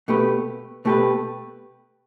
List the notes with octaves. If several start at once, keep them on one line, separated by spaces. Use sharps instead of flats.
B2 A3 G4 B4
B2 A3 G4 B4